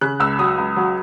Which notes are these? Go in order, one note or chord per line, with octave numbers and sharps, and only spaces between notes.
C#3 F#6
C#2 E6
F#3 D#6
C#2
F#3